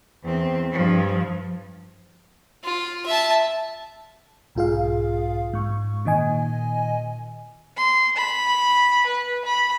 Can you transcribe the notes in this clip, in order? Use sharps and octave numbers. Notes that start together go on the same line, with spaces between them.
E2 C4
G2 F3
F4
E5 A5
B1 G#2 F4 G#4 F5
G#2 C#6
A#2 D#3 D#5 G#5
C6
B5
B4
B5